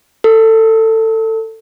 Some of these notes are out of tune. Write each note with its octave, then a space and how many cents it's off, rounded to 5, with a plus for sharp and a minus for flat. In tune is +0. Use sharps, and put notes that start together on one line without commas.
A4 +20